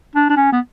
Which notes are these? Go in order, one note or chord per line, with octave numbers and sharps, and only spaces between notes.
D4
D4
C#4
B3